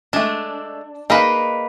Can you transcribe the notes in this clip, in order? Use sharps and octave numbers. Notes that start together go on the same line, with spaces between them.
G#3 A3 D4
A#3 D#4 G#4 B4 F5